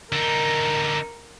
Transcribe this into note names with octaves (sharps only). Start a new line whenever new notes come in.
D3 D#4 A#4